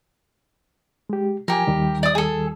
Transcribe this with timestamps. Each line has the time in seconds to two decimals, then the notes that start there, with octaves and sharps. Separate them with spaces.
1.10 G#3 G4
1.48 F3 G4 A#4 G#5
1.67 D#2 D#3 G3
2.03 D5 D#6
2.15 G#4 A4